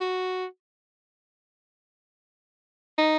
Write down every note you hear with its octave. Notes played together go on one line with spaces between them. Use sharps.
F#4
D#4